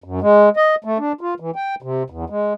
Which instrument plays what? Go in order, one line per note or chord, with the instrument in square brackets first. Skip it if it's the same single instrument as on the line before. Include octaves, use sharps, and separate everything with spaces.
[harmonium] F#2
G#3
D#5
A3
D4
F4
E3
G5
C3
E2
G#3